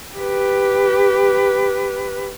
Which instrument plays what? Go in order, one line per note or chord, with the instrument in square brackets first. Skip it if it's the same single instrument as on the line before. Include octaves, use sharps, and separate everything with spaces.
[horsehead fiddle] G4 B4